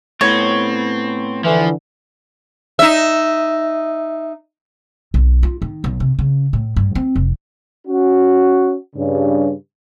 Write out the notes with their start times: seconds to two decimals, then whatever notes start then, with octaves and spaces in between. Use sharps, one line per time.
0.21 A2 B3 C4 C#5
1.45 D3 E3 F3
2.79 D#4 E5
5.14 B1
5.43 F4
5.62 D#3
5.84 B1
6.00 C3
6.19 C#3
6.53 A2
6.76 G2
6.95 C4
7.16 F1
7.87 C#4 F#4
8.96 G2 C#3